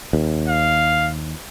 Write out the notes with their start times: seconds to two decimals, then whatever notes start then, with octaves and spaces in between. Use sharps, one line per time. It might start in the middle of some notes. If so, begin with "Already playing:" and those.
0.13 D#2
0.49 F5